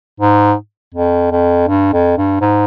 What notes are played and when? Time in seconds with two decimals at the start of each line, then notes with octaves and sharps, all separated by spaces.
0.20 G#2
0.94 F2
1.31 F2
1.68 G2
1.93 F2
2.18 G2
2.41 G#2